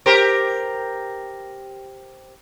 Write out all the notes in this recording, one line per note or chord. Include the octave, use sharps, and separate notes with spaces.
G4 A#4 C5